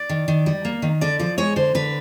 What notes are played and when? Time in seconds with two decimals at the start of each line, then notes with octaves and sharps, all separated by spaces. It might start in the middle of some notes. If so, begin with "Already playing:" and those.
Already playing: D5
0.09 D#3
0.28 D#3
0.46 G3
0.65 A#3
0.82 D#3
1.01 D3 D5
1.19 F3 D5
1.38 G#3 C#5
1.56 D3 C5
1.75 D3 B4